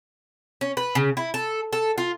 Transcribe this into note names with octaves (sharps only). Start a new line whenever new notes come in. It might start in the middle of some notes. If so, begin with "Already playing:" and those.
C#4
B4
C#3
E4
A4
A4
F4